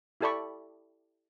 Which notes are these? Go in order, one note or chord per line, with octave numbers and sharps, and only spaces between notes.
E4 G4 A4 D5 B5 C#6